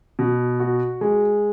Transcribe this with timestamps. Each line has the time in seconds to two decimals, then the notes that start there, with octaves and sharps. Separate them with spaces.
0.19 B2
0.60 F#4
1.01 G#3